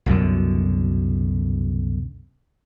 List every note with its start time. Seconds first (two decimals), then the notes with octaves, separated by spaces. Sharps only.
0.06 C2 F#2 B2 D3